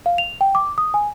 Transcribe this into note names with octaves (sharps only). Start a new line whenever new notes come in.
F5
F7
G5
D6
D#6
G#5